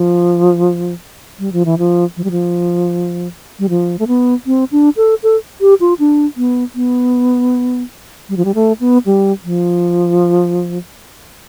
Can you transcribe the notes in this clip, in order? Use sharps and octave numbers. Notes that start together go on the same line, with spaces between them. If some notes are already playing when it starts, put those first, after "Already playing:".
Already playing: F3
G3
F3
E3
F3
F3
G3
F3
G3
F3
A3
B3
C4
D4
A4
A4
G4
F4
D4
B3
B3
G3
F3
G3
A3
B3
G3
F3